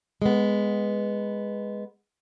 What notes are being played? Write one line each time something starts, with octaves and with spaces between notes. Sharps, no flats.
G#3 B3